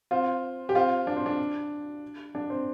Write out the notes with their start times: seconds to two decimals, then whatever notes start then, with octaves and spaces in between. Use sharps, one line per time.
0.11 C4 F4
0.69 G4
0.75 C4 F4
1.07 D4
1.16 C4
1.26 D4
2.35 D4
2.50 C4